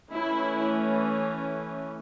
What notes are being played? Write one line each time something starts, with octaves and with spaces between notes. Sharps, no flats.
E3 A3 C#4 E4